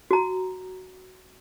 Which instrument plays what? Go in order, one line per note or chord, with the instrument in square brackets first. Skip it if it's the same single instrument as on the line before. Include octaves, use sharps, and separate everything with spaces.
[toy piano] F#4 A#5